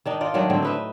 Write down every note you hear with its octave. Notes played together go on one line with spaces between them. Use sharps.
D#3 D4 D#4
D#4 F4 D5
D#3 F#3 A3 D4
A2 D3 C4
D#4 B4 E5